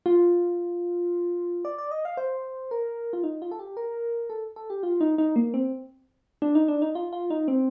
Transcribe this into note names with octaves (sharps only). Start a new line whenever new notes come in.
F4
D5
D5
D#5
F5
C5
A#4
F4
D#4
F4
A4
G4
A#4
A4
A4
G4
F4
D#4
D#4
A#3
C4
D4
D#4
D4
D#4
F4
F4
D#4
C4